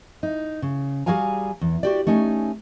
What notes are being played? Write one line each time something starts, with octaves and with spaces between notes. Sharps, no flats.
D#4
C#3
G3 F#4 G#4 F5 G#5 A#5
E2
F#4 G4 D5
A3 C#4 D#4 G#5